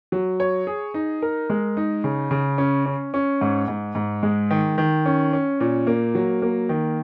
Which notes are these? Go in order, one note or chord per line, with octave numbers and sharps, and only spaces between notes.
F#3
C#5
G#4
D#4
A#4
G#3
D#4
C#3
C#3
C#4
C#4
C#4
G#2
G#2
G#2
G#3
D#3
D#3
C#4
C#4
A#2
A#3
F#3
A#3
D#3